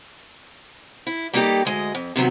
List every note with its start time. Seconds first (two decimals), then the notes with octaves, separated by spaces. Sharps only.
1.07 E4
1.33 G3 A#3 B3 D#4 G4 A4
1.65 D2 G#3 D#5
1.95 F2
2.16 C3 D#3 F#3 B3